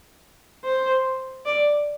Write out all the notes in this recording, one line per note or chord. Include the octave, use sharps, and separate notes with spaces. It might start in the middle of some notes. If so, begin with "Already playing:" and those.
C5
D5